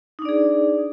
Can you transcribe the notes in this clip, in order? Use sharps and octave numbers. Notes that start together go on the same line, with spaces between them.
D4 D#4 G#4 D5